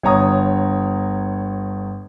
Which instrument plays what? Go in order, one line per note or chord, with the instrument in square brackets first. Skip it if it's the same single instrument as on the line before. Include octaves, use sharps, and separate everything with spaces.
[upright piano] G1 C#5 A#5 D#6